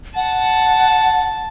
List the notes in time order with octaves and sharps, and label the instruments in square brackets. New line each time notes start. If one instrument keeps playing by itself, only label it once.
[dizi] F#5 [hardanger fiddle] A5